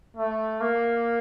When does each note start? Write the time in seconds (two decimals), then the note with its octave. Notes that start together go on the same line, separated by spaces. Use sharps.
0.17 A3
0.61 A#3